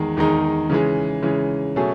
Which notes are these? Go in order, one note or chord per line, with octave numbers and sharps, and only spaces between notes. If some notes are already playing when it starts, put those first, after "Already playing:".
Already playing: E2 D#3 G#3 D#4
E2 D#3 G#3 D#4
C#3 E3 G#3
C#3 E3 G#3
B2 F#3 A3 C#4 G#4